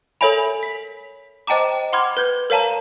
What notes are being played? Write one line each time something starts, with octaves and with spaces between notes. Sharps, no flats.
A4 A#4 C#5 E5 G#5 B5
B6
C5 D#5 G5 A5 A#5 D6
F#5 B5 C6 D6 F6 G#6
B4 G6 G#6
A#4 C#5 F5 A5 A#5